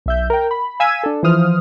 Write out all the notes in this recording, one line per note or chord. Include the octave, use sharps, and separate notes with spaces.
B1 E5 G6
A#4 G5
B5
F5 G#5 E6 G#6 B6 D#7
D4 A4
E3 F3 C5 D#6 F6